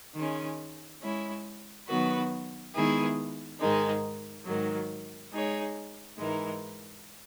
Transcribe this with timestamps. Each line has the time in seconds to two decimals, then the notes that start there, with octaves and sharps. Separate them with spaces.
0.15 D#3 G#3 C#4
1.01 G#3 C#4 E4
1.87 D#3 F#3 B3 F#4 B4
2.73 D#3 G#3 B3 E4 G#4
3.59 G#2 D#3 G#3 D#4
4.45 G#2 D#3 F#3
5.31 G#3 D#4 G#4 C#5
6.17 G#2 E3 G#3 D#4 A#4